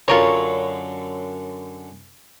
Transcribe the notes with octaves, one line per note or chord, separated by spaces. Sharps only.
F#2 D3 F4 A#4 C#5